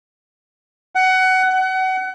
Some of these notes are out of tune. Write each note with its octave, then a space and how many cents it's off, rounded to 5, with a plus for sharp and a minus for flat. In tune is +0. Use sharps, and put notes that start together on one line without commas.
F#5 +20
F#5 +30